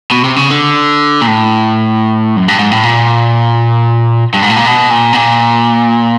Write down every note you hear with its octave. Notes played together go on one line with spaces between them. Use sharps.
B2
C3
C#3
D3
A#2
A2
F#2
G2
G#2
A2
A#2
G2
G#2
A2
A#2
B2
A#2
B2
A#2